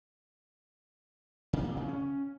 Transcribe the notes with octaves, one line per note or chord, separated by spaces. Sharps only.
C3
A#2
C#3
C#4